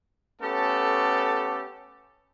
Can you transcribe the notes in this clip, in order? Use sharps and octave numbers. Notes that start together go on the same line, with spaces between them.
A3 B3 C#4 G4 A4